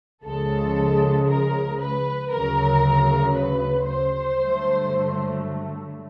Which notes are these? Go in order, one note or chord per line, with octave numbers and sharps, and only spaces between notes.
C#2 C#3 F3 G#3 A4
A#4
B4
D2 C#3 F#3 A#4
B4
C5
G2 D3 F#3 A3